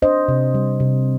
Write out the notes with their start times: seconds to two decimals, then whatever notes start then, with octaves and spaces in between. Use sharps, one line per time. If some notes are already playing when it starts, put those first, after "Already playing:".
0.02 D4 C5 D#5
0.28 C3
0.55 G3
0.80 C3